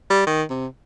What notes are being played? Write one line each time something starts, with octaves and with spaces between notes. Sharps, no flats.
G3
D#3
C3